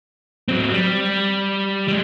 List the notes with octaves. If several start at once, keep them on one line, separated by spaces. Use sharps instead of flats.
F#3 C4
G3
G3 G#3